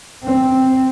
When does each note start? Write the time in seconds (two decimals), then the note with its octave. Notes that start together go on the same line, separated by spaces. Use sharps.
0.25 C4